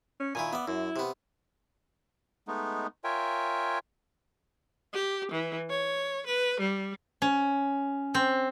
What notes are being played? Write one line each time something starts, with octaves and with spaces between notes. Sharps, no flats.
C#4
A#2 D#3 E4 G#5
B3 D5 E5
F#2 E4
C3 B3
G#3 A3 B3 D#4
F4 A#4 C#5 E5 G5 G#5
G4
E3
C#5
B4
G3
C#4
C4